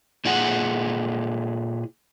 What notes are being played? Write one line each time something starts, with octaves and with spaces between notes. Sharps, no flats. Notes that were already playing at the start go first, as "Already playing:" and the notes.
A#2 E4 G#4 F#5